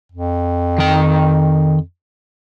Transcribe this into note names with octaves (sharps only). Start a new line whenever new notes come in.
F2
D#3 G5